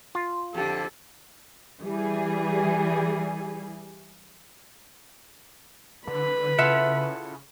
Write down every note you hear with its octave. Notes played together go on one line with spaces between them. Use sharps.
F4
F2 D3 G4 A4
E3 G3 G#4
D3 B4 B5
C#3 E4 F4 A4 E5 F#5